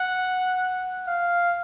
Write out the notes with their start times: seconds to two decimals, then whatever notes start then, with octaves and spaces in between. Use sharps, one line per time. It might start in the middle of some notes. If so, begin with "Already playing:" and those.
Already playing: F#5
1.07 F5